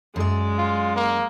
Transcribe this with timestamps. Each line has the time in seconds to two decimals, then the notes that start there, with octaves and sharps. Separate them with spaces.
0.16 F#2 G#3 D5
0.59 F4
0.96 A#3